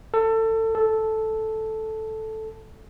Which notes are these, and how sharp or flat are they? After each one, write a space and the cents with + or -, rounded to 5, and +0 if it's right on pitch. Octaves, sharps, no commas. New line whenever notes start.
A4 +25
A4 -5